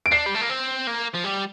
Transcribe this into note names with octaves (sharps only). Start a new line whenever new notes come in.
D7
D4 C7
G3
A3
A#3
C4
A#3
F3
G3